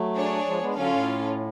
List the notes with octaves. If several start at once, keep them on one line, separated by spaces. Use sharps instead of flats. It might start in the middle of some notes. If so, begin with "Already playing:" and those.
Already playing: F#3 A3
D4 G#4 C#5
F3 G#3
G#3 B3
D3 F#3 C#4 F4 A4 F5
A2